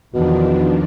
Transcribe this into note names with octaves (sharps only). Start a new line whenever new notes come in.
E2 B2 D#3 F3 D4